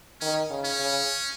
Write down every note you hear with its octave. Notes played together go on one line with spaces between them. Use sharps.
D#3 C#4
C#3
C#4
C#3